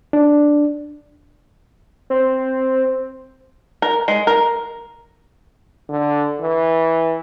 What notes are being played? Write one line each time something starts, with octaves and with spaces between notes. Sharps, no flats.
D4
C4
A#4
G#3
A#4
D3
E3